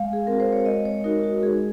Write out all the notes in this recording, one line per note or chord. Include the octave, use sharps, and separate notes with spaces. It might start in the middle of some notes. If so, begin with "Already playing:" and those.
Already playing: G#3 F5
G#4
C4 F#4 A#4
C5
C#5
G#3 D#5
C#5
D#4 F#4 A#4
F#4
G#3 G#4